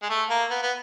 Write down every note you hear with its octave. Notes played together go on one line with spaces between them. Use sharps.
G#3
A3
A#3
B3
B3